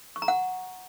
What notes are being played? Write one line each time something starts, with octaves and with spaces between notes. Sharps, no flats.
C#6
A#5
F#5